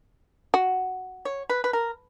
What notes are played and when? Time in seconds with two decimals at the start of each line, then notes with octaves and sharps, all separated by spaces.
0.54 F#4
1.25 C#5
1.50 B4
1.64 B4
1.73 A#4